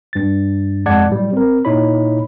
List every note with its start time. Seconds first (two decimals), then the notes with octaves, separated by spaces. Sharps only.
0.13 G2 A6
0.86 F2 G#3 D5 F#5 A5 G#6
1.09 A2 F#3 G3
1.33 C4 A#4
1.65 A#2 D#4 E4 C#5 B5